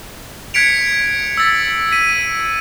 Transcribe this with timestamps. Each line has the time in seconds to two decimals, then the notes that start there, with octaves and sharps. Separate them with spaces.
0.54 F#6 G#6 B6 C#7 D7 F7
1.37 E6 A6 B6
1.92 B6 D#7